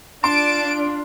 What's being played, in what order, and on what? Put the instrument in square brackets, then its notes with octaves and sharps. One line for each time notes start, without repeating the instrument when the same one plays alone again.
[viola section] D4 F4 [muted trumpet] A5 [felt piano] C6 [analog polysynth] D7